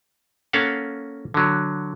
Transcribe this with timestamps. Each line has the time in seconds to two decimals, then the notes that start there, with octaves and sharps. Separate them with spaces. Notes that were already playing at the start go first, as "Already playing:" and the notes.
0.53 A#3 C#4 A4 F5 F#5
1.34 D3 F#3